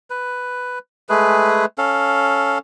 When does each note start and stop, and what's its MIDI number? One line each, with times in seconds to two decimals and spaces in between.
0.10 0.79 71
1.09 1.65 56
1.09 1.65 57
1.09 1.65 68
1.09 1.65 71
1.78 2.58 61
1.78 2.58 69
1.78 2.58 77